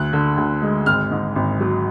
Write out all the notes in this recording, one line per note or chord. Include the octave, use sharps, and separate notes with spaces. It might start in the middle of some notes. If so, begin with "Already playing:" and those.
Already playing: D2 F#6
D3
D2
G#3
G#1 F6
G#2
G#1
F#3